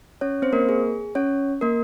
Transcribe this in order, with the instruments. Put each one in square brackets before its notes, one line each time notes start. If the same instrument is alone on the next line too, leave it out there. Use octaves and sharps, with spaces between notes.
[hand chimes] C#4 C#5
C4 C5
A#3 A#4
G#4
C#4 C#5
A#3 A#4